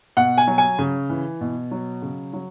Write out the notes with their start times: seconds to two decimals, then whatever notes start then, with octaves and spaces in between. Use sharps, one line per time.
0.17 B2 F#5
0.38 G#5
0.47 F#3
0.58 G#5
0.79 C#3
1.10 E3
1.41 B2
1.71 F#3
2.02 C#3
2.33 F#3